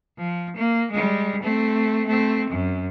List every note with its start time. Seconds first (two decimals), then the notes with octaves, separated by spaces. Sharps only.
0.18 F3
0.56 A#3
0.91 G3 G#3
1.42 A3 C4
2.07 A3 C4
2.50 F#2